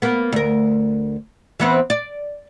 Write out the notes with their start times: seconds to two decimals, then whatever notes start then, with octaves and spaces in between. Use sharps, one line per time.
0.02 A#3 B3
0.32 D2 A#4
1.60 E3 B3 C4
1.90 D5